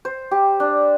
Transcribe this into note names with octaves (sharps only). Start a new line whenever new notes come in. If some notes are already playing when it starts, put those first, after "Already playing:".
C5
G4
D4